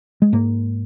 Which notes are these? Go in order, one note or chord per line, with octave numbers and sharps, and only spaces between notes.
G#3
G#2 A#3